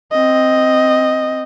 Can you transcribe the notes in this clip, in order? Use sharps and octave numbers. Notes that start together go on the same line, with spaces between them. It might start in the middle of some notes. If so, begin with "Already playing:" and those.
C4 D#5